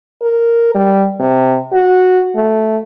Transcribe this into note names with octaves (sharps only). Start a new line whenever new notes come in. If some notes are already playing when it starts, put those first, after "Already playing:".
A#4
G3
C3
F#4
A3